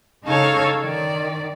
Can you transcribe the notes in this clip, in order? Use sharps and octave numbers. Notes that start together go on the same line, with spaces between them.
C#3 D#4 A4 C#5 F5 C#6
D#3 D5